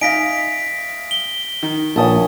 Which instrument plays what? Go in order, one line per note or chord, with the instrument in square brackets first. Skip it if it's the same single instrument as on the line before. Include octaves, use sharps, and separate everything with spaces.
[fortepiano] D#4 [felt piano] E5 F5 G#5 [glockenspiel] A#6 B6 D7
[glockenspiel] G7
[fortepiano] D#3
[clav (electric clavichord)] A#1 [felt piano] A#4 B4 C#5 [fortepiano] A5 D#6